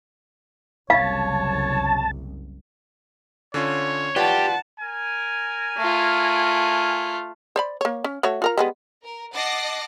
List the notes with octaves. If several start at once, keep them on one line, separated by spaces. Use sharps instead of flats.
F#1 C2 C#5 F5 A5
D3 C#4 F4 C#5
F4 G4 B4 D5 F#5 A5
A#4 G#5
A3 F4
C5 D5 B5
A#3 C#5
C#4
A3 F#4 C#5
F4 A#4 A#5
G3 G#3 B3
A#4
D#5 F#5 A5 D6 A#6 C7